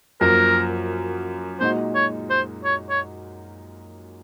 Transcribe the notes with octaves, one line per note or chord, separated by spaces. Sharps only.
F#2 F3 A#3 A#4
A#2 G#3 D#4 F#4 C5
C#5
C5
C#5
C#5